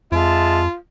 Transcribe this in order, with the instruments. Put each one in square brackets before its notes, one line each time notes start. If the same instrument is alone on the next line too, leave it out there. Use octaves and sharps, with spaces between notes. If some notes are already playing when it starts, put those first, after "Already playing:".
[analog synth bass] F2 [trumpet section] G#3 E5 A5 [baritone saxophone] F4